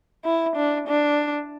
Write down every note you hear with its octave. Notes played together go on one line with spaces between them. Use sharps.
E4
D4
D4